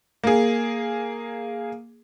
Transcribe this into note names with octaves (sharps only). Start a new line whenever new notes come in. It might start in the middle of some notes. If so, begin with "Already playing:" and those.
A#3 G#4